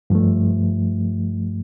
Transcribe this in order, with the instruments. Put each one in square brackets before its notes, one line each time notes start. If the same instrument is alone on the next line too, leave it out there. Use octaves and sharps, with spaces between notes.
[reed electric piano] G2 F3 A3